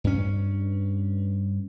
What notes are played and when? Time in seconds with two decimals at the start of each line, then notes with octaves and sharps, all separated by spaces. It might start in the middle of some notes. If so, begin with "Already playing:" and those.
0.04 G2 C#4